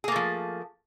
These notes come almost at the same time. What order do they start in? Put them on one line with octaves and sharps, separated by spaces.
G#4 A#3 A3 F3